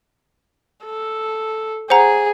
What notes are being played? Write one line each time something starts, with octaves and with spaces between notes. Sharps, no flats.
A4
G#4 C5 F#5 A#5